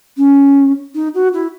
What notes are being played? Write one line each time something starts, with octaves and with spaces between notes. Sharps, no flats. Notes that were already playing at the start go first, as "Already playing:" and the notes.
C#4
D#4
F#4
E4